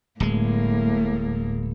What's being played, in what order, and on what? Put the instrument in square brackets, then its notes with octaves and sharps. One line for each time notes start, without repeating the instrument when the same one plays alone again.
[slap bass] D1 G#3 [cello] A2 A#3